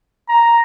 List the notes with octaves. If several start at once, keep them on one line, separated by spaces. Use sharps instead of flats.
A#5